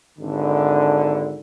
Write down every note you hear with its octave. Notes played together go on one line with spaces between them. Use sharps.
G#1 D3